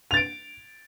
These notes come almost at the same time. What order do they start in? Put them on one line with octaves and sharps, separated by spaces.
F7 A6 D7